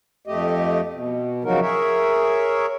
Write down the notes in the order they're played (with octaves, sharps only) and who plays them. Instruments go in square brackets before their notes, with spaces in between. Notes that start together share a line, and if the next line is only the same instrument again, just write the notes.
[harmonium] F2 A3 G4 D#5
B2
C#3 F3 F#3 D#4 F#4 A#4
G#4 A#4 C#5 E5